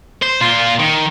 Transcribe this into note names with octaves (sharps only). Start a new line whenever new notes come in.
C5
A#2 F4
D#3